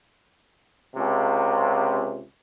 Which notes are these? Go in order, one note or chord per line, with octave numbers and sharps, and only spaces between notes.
C#2 C3